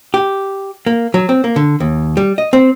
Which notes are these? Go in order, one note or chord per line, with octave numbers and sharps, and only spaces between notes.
G4
A#3
F#3
C4
A#3
D3
D#2
G3
D#5
C4